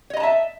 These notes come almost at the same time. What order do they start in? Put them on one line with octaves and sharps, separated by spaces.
C#5 D#5 A#5 A5 E5